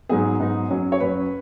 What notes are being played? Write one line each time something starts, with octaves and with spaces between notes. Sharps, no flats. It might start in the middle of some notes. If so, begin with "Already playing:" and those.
G#2 F#3 B3 D#4 G#4
G#2 F#3 B3 D#4
F#2 F#3 C#4
C#5
F#2 F#3 C#4 B4